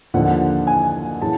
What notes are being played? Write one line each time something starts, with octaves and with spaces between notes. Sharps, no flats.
D#2 D3 F3 F#5
G#5
C#3 E3 A5